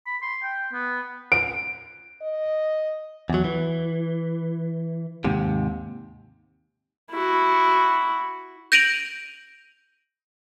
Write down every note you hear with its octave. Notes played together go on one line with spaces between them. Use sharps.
B5
C6
G5
B3
D7
D#5
E2 F#3
E3
D#2 G#2 C3
E4 F#4
G6 A#6 D7 D#7 F7 F#7